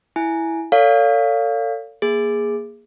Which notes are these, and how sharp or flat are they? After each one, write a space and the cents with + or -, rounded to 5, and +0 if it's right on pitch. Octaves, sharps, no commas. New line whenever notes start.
E4 +0 G#5 +10
A4 +35 C#5 +40 F5 +0
A#3 +10 G#4 -5